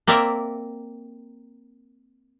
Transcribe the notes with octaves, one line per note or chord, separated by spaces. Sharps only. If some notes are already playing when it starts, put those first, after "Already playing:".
A#3 C4 A#4 D5 E5